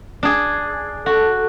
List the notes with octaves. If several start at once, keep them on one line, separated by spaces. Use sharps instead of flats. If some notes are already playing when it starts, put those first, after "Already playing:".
D4 G#4
F#4 A4